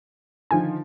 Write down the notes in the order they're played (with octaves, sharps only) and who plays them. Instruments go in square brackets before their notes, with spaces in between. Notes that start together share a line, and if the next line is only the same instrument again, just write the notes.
[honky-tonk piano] D3 D#3 F3 [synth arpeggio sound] G#5